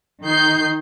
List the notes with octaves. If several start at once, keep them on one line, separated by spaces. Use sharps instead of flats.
D#3 D#4 G6 C7